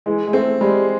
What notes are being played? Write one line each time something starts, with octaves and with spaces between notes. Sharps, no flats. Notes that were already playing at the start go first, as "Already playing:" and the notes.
E3 G#3
G#3
A3 C4
G3 G#3